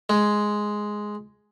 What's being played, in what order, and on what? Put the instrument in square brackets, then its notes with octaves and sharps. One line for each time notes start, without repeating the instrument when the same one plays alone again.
[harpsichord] G#3